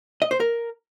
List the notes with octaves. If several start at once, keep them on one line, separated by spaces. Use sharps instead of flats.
D#5
C5
A#4